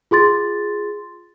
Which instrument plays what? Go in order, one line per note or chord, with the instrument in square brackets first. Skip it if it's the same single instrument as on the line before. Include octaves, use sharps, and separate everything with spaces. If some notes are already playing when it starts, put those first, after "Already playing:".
[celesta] F4 G#4 C6 A6